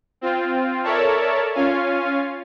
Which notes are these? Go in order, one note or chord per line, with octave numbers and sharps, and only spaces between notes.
C4 F4
A4 A#4 C#5 D5 E5 A5
C#4 F4 F5 G#5